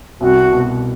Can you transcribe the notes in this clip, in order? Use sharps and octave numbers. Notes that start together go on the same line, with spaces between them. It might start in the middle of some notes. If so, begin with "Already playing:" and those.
C2 F#4
B2